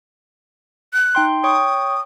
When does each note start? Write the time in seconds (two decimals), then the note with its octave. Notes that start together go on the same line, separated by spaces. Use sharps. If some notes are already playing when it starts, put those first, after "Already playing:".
0.93 F#6
1.15 D#4 G5 C6
1.44 C#5 G5 C#6 D#6